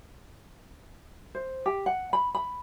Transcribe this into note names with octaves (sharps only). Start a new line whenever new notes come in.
C5
G4
F#5
B5
B5